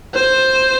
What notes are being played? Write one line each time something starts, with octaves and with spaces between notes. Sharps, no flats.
C5